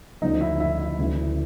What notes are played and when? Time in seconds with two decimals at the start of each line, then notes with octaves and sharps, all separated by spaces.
0.22 D2 C#3 F3 D#4 D#5
0.41 E4 E5
0.60 E4 E5
0.98 D2 C#3 E3